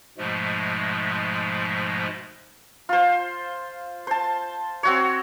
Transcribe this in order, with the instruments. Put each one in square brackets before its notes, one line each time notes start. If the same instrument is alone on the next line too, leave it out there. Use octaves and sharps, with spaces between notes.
[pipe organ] G#2 B2 F3 G#3 A3
[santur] F4 C5
C5 A5
C4 F#4 C#5